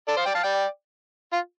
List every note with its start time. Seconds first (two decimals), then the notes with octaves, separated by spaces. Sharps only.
0.08 A4 D5
0.17 C5 F5
0.25 D5 G5
0.35 F5 A5
0.43 D5 G5
1.33 F4